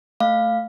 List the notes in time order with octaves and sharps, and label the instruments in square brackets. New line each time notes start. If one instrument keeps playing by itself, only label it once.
[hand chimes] A3 F5